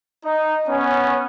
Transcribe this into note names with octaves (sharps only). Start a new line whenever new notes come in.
D#4
B3 C#4